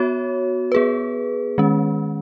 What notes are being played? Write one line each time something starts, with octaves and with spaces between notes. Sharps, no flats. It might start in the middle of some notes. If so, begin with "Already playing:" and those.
Already playing: B3 F#4 C#5
B3 G#4 B4
D#3 G#3 C#4